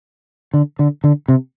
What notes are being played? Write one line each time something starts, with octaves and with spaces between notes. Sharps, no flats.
D3
D3
D3
C3